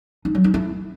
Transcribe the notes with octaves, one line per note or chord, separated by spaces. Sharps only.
D#4
F#3
D#4
E4